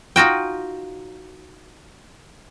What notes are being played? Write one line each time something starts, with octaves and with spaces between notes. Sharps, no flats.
D#4 F4 F#4 G5